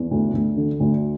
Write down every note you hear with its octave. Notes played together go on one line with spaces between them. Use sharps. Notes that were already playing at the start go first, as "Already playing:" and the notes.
Already playing: E2
D2
D2
D3
D2